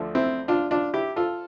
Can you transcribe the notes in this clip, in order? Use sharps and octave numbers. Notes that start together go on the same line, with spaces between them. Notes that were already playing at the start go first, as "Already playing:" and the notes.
Already playing: D2 D3 F3 A3
C4 E4
D4 F4
D4 F4
E4 G4
F4 A4